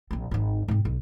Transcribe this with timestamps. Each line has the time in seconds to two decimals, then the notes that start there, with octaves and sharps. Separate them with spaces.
0.11 A#1 C4
0.31 G#1 D#4
0.68 G#2 C4
0.85 B1